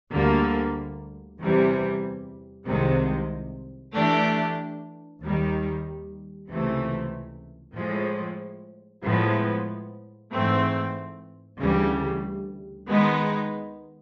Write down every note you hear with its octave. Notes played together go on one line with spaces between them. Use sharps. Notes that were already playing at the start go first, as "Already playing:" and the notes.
D2 D3 G3 A#3
E2 C3 E3 G3
C2 C3 D#3 G#3
E3 A3 D4 G4
D#2 D#3 G3
C#2 C3 E3 A3
A2 F3 G#3
A2 F3 G#3 B3
G#2 E3 A3 C4
D2 C#3 E3 G3
D#3 G#3 B3 D#4